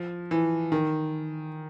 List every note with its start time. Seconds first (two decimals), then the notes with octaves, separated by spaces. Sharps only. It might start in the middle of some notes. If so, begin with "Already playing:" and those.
Already playing: F3
0.31 E3
0.72 D#3